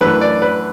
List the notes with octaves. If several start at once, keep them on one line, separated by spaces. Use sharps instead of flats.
F#2 E3 A3 D4 B4
D5
B4